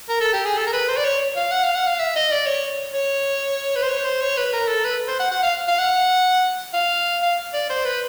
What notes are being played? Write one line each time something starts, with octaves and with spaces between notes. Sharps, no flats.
A#4
A4
G4
G#4
A4
A#4
B4
C5
D5
C#5
F5
F#5
F5
F#5
F5
E5
D#5
D5
C#5
C#5
B4
C5
C#5
C5
C#5
B4
A#4
A4
B4
C5
F#5
F#5
F5
F5
F#5
F5
F5
D5
C5
B4